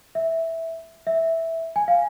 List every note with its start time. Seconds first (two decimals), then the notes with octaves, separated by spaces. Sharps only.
0.15 E5
1.07 E5
1.76 G#5
1.88 F5